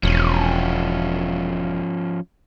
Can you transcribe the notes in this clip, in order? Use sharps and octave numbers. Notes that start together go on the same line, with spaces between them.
E1 F3 C#4